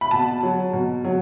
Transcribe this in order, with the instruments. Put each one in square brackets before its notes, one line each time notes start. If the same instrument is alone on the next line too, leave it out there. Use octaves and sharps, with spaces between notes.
[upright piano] B5
B2 A5
F#3
B2
F#3